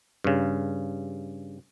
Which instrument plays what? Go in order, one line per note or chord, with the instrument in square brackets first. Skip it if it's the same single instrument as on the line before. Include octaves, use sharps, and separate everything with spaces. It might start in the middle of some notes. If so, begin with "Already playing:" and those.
[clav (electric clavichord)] G2 C#3